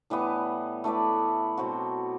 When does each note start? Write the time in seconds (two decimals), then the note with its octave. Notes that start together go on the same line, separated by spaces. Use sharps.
0.10 A2 E3 G3 B3
0.84 A3 E4 B4 D5
1.57 B2 F#3 C4 F#4